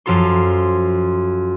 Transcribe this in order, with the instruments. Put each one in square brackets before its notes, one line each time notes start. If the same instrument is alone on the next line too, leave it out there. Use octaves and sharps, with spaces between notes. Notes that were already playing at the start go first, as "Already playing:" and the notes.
[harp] F#2 F3 F4 A4 C6